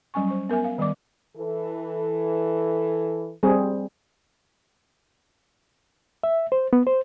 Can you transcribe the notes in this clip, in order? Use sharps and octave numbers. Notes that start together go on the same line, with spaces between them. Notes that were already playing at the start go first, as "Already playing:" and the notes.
F#3 G3 C#4 G#5 C#6
C5 C#6
B3 A#4 E5 G#5
F5
D#3 G3 B3 D5 D6
E3 A4
G3 C4 G#4
E5
C5
B3
C5